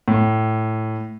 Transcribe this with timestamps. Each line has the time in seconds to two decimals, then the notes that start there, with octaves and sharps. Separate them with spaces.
0.08 A2